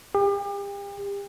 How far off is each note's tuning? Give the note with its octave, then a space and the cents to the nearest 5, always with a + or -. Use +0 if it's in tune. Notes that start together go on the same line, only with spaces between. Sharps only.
G4 +40